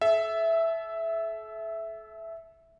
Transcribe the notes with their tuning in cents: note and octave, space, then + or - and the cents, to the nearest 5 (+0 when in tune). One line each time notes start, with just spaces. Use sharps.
A4 -35 E5 +0